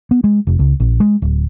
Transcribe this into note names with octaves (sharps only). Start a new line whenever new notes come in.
B3
G#3
F1
C#2
A#1
G#3
D1